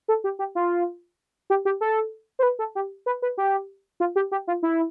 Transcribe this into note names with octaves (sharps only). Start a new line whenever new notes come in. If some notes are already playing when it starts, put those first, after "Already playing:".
A4
G4
G4
F4
G4
G4
A4
C5
B4
A4
G4
B4
B4
G4
F4
G4
G4
F4
E4